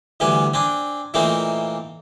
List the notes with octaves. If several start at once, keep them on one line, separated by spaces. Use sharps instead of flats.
D2 E3 G3 B4 G#5
C4 D4 G#5
A#2 E3 A3 A#3 C4 D#4